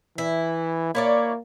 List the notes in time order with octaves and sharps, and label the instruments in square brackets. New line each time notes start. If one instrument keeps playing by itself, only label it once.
[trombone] E3 [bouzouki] E4
[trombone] A#3 [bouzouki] E4 C#5 D5